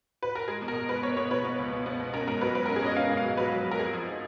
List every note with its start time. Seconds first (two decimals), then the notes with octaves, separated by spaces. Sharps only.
0.23 B4
0.35 A#4
0.48 G#3 G#4
0.62 B2
0.68 A#4
0.75 B2
0.89 G#3 B4
1.03 B3 C#5
1.17 B2 C#5
1.31 B3 B4
1.45 B3
1.59 C#2
1.72 B2
1.86 B3
2.00 B2
2.14 C#4 A#4
2.27 G#2 A#4
2.41 F#3 B4
2.55 G#2 B4
2.66 A#4
2.69 C#4
2.76 G#4
2.82 C#4 D#5
2.96 C#4 F5
3.10 G#2
3.17 F5
3.24 F#3
3.37 F#3 B4
3.52 F#3
3.66 F#3
3.71 A#4
3.79 F2 G#4
3.93 F3
4.07 D#4